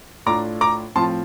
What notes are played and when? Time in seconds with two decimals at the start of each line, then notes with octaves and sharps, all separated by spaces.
0.26 A2 A3 D4 F4 A#5 D6
0.61 A#5 D6
0.95 A2 F3 C4 F4 A5 C6